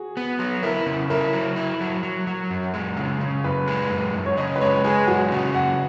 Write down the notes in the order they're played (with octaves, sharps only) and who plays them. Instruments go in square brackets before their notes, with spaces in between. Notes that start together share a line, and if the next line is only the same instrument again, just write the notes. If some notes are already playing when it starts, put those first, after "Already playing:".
Already playing: [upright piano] F#4 G#4
[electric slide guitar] B3
F#3
[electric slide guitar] E4 [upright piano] A#4
[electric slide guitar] C#3
[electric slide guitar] E4 [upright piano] A#4
[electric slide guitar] F#3
E4
F#3
F#3
F#3
F#2
G#3
C#3
C#3
[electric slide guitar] F#2 [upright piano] B4
[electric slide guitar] G#3
F#2
F#2
[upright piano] C#5
[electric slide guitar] C#3 [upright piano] D#5
[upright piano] B4
[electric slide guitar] G#3 [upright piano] C#5
[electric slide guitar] G#3 [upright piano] G#4
[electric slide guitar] F#2 [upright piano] F#4
[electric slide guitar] C#3
[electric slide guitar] F#2 [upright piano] F#5